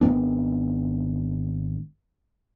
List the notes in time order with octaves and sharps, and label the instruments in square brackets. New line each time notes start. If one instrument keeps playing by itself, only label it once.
[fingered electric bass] G#1 G#2 B3 D4